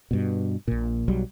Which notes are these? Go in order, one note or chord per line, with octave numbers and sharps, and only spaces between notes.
G2 B2
A#1 A#2
B1 F#3 G3